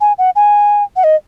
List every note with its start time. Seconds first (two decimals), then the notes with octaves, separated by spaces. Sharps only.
0.01 G#5
0.18 F#5
0.36 G#5
0.96 F#5
1.04 D#5